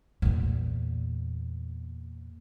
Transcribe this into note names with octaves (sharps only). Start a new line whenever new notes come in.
E2 A#2